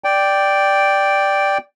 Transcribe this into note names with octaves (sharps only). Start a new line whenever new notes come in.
D5 G5